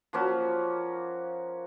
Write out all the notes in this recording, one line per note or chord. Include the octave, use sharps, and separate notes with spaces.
F3 A#3 C#4 F#4